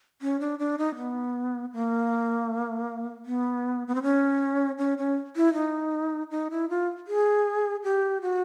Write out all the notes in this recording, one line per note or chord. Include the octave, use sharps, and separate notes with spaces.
C#4
D4
D4
D#4
B3
A#3
B3
B3
C4
C#4
C#4
C#4
E4
D#4
D#4
E4
F4
G#4
G4
F#4